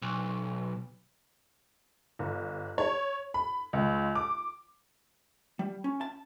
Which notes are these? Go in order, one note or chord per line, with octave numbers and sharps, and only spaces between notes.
B1
G1
C#5
B5
C#2
D6
G3
C#4
A5